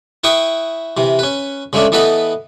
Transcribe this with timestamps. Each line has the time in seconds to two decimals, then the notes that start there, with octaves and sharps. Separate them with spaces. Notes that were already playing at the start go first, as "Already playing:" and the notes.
0.24 E4 B4 G5 C#6 D#6
0.97 C3 E3
1.19 C#4 B4
1.73 C#3 G#3 A3 C#4 D4
1.92 E3 B3 A4 B4 D#5 B5